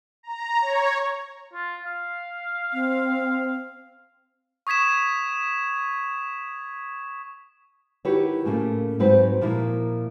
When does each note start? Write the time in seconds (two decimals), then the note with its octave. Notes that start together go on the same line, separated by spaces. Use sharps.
0.23 A#5
0.62 C#5
1.53 F4
1.85 F5
2.74 C4
4.67 C#6 D#6 G#6 B6 E7
8.05 D#3 E4 F#4 G4 B4 C#5
8.45 A2 C#3 A3 A#3 F4
8.99 G#2 F#3 C4 F#4 B4 C5
9.41 A#2 F3 A#3 E4 F4